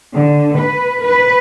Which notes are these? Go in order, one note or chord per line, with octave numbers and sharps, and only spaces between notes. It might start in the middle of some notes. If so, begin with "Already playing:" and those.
D3
B4
B4